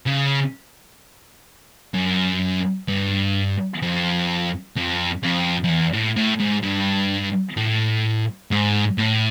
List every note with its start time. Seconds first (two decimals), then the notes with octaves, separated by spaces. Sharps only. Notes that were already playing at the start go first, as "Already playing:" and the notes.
0.06 C#3
1.94 F#2
2.88 G2
3.82 F2
4.76 F2
5.23 F2
5.64 F2
5.69 E2
5.93 A2
6.16 A2
6.40 G#2
6.63 G2
7.57 A2
8.51 G#2
8.98 A2